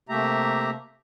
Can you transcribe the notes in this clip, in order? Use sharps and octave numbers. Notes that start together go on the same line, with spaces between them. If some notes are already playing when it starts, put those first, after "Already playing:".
C3 A3 A#3 G4 E5 A#5